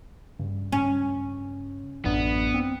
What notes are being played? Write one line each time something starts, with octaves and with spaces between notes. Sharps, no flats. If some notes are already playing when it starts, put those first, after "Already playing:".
G2 C#3
C#4
A1 F#2 B3 D4
C4